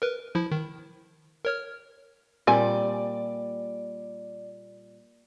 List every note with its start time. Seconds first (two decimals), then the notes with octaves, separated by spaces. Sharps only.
0.02 A#4 B4
0.35 F3 E4
0.52 D#3
1.45 A#4 C#5 F6
2.47 A#2 G3 C4 D5 G#5